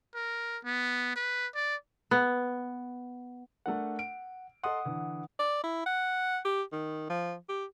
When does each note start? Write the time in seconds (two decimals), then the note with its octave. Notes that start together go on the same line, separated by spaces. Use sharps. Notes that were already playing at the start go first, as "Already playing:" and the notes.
0.15 A#4
0.65 B3
1.16 B4
1.55 D5
2.11 B3
3.66 A3 D4 A#4 F#5
3.99 D7
4.64 A4 D#5 F#5 C6 D#6
4.85 D3 E3
5.39 D5
5.63 E4
5.86 F#5
6.45 G4
6.72 D#3
7.09 F3
7.49 G4